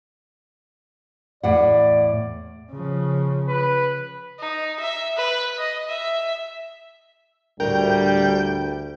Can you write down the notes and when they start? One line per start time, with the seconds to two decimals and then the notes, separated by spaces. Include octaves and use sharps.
1.43 E2 A2 D5 F#5
2.71 C#3 F3
3.48 B4
4.39 D#4
4.80 E5
5.17 B4
5.59 D#5
5.89 E5
7.60 D2 A2 G3 A#4 G5